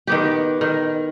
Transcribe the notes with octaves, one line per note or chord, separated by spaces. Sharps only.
D#3 B3 G4
D#3